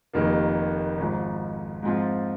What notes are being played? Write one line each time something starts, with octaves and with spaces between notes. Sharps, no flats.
F1 F2 D#3 A#3
G#1 G#2 F3
G#2 F3 C4 F4